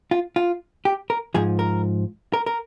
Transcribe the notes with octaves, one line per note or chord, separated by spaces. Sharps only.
F4
F4
G4
A#4
G#2 F3 G#4
A#4
A#4
A#4